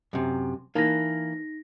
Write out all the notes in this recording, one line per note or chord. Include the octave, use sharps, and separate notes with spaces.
F#2 C3
E3 A#3 D#4 A#6